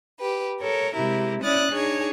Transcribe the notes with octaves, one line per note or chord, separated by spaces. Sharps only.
G4 B4
A4 A#4 C#5
C3 G#3 E4 G4 A#4
C#4 E4 D5 D#6 F#6 A6
D4 D#4 G#4 C#5